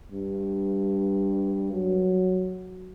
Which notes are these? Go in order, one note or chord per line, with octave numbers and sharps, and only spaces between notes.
G2
F#3